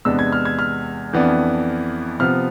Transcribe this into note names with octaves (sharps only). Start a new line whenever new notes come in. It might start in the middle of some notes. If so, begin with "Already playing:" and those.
E2 C3 G#3 B3 D4 E6
G#6
F6
G#6
F6
F2 E3 B3 D4
C3 F3 B3 F6